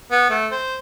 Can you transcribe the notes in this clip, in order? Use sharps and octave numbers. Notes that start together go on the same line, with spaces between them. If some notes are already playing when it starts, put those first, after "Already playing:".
B3
A3
C5